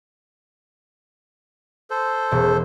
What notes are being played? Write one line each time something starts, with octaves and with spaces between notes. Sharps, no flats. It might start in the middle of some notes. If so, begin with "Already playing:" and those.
A4 C5
E1